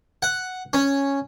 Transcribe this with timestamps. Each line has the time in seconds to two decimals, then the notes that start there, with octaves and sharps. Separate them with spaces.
0.22 F#5
0.73 C#4